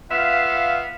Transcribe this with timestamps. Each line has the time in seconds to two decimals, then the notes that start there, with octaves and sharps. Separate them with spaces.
0.11 B3 F4 E5 F5